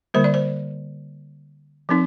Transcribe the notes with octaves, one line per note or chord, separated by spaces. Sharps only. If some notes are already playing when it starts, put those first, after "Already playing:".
D3 G3 A#3 C5
D5
C5
F3 C4 D#4